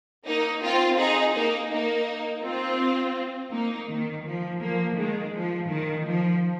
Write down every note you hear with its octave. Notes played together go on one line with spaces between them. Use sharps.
A#3 D#4
C4 F4
D#4 G#4
A#3 D#4
A#3 D#4
C4 F4
A#3 D#4
D#3
F3
F3 A#3
D#3 G#3
F3
D#3
F3